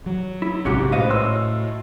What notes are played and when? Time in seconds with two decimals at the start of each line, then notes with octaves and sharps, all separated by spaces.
0.06 F#3
0.42 E4
0.65 A#1 G#2 C3 C#4 F#4 G4
0.92 A2 F#4 B4 C5 D#5 F5
1.09 C#5 C6 E6